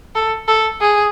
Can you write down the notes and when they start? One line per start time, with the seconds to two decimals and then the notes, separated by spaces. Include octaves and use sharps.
0.15 A4
0.48 A4
0.81 G#4